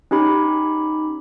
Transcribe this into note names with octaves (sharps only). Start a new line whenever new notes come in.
C#4 D#4 G4 B5